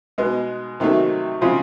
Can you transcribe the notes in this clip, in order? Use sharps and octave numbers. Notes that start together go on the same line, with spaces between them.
B2 G#3 B3
C3 D#3 F#3 A3
C#3 F3 G#3 C4 F4